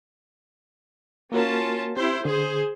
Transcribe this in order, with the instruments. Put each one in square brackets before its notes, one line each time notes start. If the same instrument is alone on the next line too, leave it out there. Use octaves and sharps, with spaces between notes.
[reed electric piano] A#3 F#4 A#4 [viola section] C#4 F4 A5
[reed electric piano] C4 G4 [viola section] E4 C5
[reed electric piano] D3 [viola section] G#4 C5